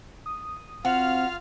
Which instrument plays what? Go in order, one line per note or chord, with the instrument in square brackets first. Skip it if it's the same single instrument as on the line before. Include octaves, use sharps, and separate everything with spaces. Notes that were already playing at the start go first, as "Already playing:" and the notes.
[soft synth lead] D#6
[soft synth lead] C4 [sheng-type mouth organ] F4 F5 F6 [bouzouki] F#4